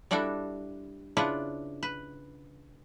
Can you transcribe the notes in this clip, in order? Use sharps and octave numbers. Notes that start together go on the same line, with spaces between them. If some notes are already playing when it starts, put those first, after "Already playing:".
G3 D4 E4 F#4 A4
C#3 D4 E4 F4 B4
B4